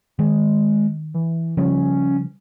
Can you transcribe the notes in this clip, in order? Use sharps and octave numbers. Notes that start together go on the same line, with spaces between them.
D#3 G#3
E3
C#3 F3 G3 C#4